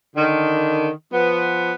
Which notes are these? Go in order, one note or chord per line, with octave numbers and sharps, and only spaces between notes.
D3 D#3
F3 B3